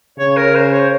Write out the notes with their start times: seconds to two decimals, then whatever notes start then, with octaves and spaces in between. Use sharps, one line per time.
0.18 C#3 C#5
0.37 A#4
0.55 C5
0.73 C#5